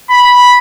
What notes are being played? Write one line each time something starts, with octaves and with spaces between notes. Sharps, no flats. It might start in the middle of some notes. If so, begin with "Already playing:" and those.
B5